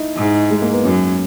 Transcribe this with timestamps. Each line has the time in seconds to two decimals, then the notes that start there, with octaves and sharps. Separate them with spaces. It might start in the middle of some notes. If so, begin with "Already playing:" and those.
Already playing: D#4 E4
0.16 G#2
0.51 G#3
0.62 A#3
0.73 B3
0.84 F#2 C#4